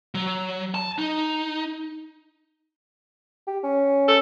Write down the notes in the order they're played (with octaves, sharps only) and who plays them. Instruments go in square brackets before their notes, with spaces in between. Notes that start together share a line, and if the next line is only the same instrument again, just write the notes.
[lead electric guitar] F#3
A5
D#4
[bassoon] G4
C#4
[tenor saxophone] A4